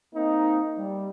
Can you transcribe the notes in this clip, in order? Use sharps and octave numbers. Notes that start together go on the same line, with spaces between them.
A#3 C4 D#4
G3